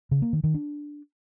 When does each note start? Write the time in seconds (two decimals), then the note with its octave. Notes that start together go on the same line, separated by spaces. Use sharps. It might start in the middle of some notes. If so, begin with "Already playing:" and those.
0.11 C#3
0.22 A#3
0.33 D#3
0.44 D#3
0.54 D4